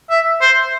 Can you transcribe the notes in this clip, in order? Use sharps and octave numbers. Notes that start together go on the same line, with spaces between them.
E5
C5